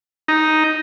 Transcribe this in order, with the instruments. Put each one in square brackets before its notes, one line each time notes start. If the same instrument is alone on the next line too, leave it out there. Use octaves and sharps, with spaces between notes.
[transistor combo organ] D#4